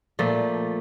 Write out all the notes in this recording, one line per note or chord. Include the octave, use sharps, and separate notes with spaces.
A#2 F3 A3